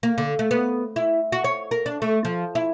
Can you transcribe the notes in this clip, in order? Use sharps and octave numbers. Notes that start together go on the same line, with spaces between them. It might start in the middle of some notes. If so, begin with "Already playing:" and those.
A#3
D3
A3
B3
E4
F#4
C#5
A#4
D4
A3
F3
E4